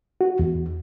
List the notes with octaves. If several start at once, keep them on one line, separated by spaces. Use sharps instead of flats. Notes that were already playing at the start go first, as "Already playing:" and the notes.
F#4
E2